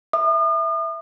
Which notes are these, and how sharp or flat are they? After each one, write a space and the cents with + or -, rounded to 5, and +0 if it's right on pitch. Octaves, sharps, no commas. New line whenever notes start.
E5 +0 D#6 -40